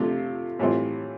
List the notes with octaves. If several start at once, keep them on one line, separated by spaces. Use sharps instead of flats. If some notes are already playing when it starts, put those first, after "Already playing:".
Already playing: C3 F3 A3 D4 F4
A2 E3 G3 C4 F4